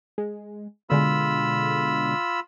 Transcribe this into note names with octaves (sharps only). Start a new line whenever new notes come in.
G#3
B2 D3 G#3 F4 B5 E6